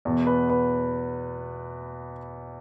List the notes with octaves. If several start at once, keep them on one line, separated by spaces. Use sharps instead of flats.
E2 B2
B4
B4